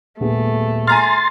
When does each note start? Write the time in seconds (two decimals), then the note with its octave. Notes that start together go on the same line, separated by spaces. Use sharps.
0.20 D#1 A3 B3 G#4
0.87 G#5 A#5 C6 F6 A6